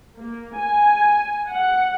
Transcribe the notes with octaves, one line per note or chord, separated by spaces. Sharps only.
A#3
G#5
F#5